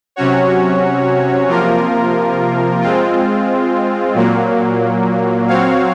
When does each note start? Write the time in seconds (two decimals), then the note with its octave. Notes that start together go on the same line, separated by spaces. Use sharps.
0.16 C3 F#3 C#4 F#4 C#5
1.48 C3 F3 A#3 F4 A#4
2.82 G#3 C4 F4
4.14 A#2 F#3 A#3
5.47 F#3 C4 F#4 C#5 F5